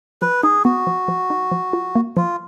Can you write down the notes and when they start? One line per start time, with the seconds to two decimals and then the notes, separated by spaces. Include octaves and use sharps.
0.22 F3 B4
0.43 D#4 G#4
0.65 B3 F#4
0.87 F3
1.08 F3
1.30 D#4
1.52 F3
1.73 F4
1.95 A#3
2.17 F3 F4